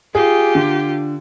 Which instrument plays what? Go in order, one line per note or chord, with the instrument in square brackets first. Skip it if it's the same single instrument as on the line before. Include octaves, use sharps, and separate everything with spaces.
[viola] F4 G4 [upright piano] G#4
[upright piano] D3